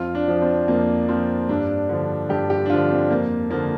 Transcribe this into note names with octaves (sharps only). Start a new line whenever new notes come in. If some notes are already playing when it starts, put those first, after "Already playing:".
Already playing: F2 F4
D4
F3
C4
F2 A#3
F3 C4
G2 D4
D3 F3
G2 G4
G4
D4
D3 F3 F4
C4
F2 A#3
D3 F3 A#3